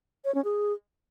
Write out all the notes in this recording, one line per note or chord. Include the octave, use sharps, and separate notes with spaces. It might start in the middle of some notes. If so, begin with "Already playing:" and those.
C#5
C#4
G#4